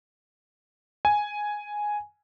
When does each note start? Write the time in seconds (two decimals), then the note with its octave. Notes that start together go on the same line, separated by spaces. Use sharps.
1.05 G#5